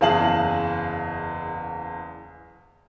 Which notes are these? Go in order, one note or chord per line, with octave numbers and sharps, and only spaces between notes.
F#1 E2 G#4 F5 A5 F#7